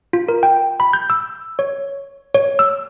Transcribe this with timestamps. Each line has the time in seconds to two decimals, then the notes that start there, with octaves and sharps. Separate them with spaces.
0.13 F4
0.29 A#4
0.43 G5
0.80 B5
0.93 G6
1.10 E6
1.59 C#5
2.35 C#5
2.59 E6